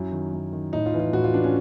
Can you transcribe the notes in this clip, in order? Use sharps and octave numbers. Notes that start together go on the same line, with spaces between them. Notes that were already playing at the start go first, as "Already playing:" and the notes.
Already playing: F#2 E4
D#3
F#2
D#3
A2 D#4
F4
E3
F4
A2 F#4
F4
E3 D4
C#4